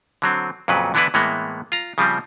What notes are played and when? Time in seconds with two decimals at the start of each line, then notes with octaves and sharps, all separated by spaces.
0.22 D3 F#3 C4
0.68 F2 A#2 C#3 F#3 B4
0.94 D3 E3 B3 D4 E4 B4
1.14 A2 E3 G#3 A#3 B3
1.72 F4 A#5
1.98 C#3 F3 G3 C4